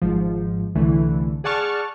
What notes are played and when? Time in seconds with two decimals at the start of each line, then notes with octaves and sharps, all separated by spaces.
0.02 G#1 G#2 F3
0.75 C2 D3 E3 A3
1.44 G#4 D5 F#5 A5 C#6 F6